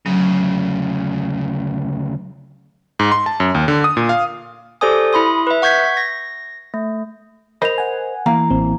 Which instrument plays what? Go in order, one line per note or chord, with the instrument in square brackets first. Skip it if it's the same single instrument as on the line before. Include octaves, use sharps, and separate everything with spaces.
[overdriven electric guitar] D2 C#3 [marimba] F#3
[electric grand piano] G#2
C6
A5
F#2
D#2
D3
D#6
A#2
F5
[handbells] G4 A4 C5 D5 G#5 D#6
E4 B5 C6 D#6
B4 E5
F#5 C#6 G6 G#6 B6
A#6
A3
[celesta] A#4 F7 [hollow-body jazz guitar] C5 D#5 B5
[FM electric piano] F#5 G#5
[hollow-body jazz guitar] E3 A#3 F5 [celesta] A#5
[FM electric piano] A1 C4